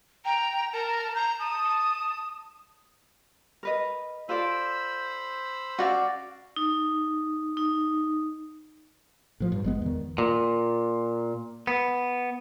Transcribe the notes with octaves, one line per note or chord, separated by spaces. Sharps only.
G5 A#5
A#4 A5
A#5 G6
A5 D#6
A5
A#4 B4 D#5
F4 A4 C5 D5 B5 E6
C#4 F#4 D5 F5
D#4
D#4
A2 F3
G2
G1 G#3 B3
E2 D#3
A#2
B3